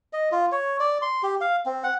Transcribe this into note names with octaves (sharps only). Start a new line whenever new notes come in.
D#5
F4
C#5
D5
C6
G4
F5
C4
F#5